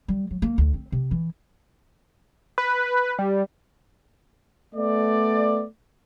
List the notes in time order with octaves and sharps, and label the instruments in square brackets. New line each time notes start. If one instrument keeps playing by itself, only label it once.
[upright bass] G3
F#3
A#3
D2
C4
C3
E3
[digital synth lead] B4
G3
[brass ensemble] A3 B3 D5